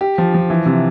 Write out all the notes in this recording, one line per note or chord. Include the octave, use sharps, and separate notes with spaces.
G4
F3
F3
E3
C3